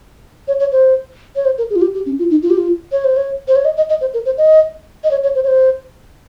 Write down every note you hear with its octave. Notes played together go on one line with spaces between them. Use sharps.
C#5
C#5
C5
C#5
C5
A#4
G#4
F4
G4
G4
C#4
F4
D#4
F4
G4
F4
C#5
C5
C#5
C5
C#5
D#5
D#5
D#5
C5
A#4
C5
D#5
D#5
C#5
C#5
C5
C#5
C5